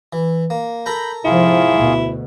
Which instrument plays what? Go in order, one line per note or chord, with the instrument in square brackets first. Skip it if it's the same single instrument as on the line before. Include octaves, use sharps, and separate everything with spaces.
[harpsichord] E3
A#3
[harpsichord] A4 A#4 A#5 [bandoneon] B5 G6
[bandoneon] G#2 F4 G#4 [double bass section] C3 F3 [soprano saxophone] E4
[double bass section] D2 B2